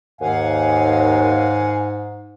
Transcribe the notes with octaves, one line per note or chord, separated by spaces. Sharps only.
D#2 G#2 F5 F#5 G#5